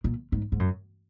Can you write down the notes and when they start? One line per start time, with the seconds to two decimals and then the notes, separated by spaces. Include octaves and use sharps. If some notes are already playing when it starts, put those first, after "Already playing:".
0.04 A#2
0.32 G#2
0.52 G#2
0.59 F#2